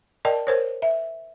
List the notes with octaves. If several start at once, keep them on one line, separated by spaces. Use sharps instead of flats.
A#4 D5 D#5 G5 A5
A#4 C5 C#5
E5